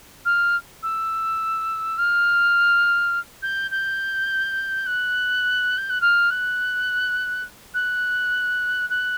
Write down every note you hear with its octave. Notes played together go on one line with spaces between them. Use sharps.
F6
E6
F6
G6
G6
F#6
G6
F#6
F6
F#6
F#6
F#6